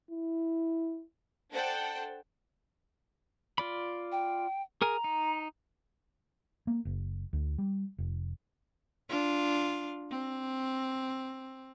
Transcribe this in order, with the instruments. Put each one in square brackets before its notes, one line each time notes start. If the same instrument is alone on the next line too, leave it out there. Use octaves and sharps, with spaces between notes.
[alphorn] E4
[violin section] D4 A4 C5 F#5 G5 A5
[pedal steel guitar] F4 D5 B5
[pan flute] G5
[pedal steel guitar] G#4 A#4 G#5 [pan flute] A#5
[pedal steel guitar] D#4
[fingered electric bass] A#3
F#1
D2
G3
F1
[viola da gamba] D4 F4
C4